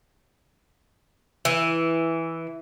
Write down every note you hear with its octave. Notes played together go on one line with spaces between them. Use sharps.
E3